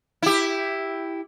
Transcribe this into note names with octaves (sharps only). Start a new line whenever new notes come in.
E4 G4